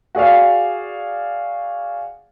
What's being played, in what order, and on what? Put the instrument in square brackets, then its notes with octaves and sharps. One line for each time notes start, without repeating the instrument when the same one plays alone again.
[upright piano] F#4 G#4 D5 F5